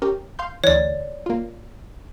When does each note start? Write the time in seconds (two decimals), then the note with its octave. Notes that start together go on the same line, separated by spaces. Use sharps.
0.02 C#4 G4 A#4
0.39 F5 C6 G6
0.64 D2 E3 C#5 D5
1.26 A#3 F4